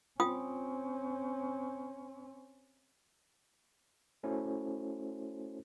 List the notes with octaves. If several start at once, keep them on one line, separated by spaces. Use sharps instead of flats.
C4 C#4 F4 G5 D#6
A3 C#4 E4 F#4 A4 C5